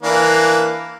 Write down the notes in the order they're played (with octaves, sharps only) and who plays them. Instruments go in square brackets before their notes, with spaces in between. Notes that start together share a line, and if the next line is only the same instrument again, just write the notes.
[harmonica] E3 A#3 D4